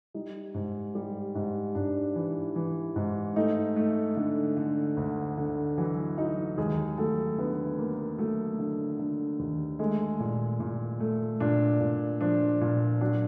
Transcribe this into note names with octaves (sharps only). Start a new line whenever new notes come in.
G3 D#4
G#2
G3
G#2
G#2 D4
E3
E3
G#2
A3 D#4
A3
D3
D3
D2
D3
E3 F#3 E4
F#3 D#4
D#2 G#3 G#4
F#3 A3 A4
D3 B3 B4
A3 A#3 A#4
F#3 A3 A4
D3
D3
D#2
G#3 A3 G#4
A#2
A#2
A3
A#2 D4
A#2
F3 D4
A#2
F#3 D4